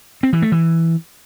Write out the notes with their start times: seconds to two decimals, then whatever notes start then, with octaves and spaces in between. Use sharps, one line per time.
0.23 C4
0.33 E3
0.42 A3
0.52 E3